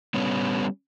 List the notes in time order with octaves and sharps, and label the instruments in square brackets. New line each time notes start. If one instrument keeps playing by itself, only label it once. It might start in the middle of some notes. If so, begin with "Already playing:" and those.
[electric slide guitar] G3 B3 C#4